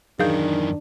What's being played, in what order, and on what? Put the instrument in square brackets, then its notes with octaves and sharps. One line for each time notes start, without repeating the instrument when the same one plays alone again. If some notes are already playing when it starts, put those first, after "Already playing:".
[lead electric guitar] F#2 E3 [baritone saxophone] D#3 [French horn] D4 [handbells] G#4 F5 G6